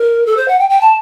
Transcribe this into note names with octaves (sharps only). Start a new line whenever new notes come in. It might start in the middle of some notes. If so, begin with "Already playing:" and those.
Already playing: A#4
A4
C5
F#5
G5
G5
A5